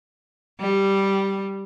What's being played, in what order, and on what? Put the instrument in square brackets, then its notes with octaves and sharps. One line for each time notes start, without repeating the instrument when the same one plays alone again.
[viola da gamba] G3